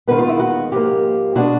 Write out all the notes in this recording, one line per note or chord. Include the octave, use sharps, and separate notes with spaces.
D#2 D#3 G#3 B3 B4
F4
E4
F#4
G#2 F3 A#3 G4
B2 G#3 B3 D4 F#4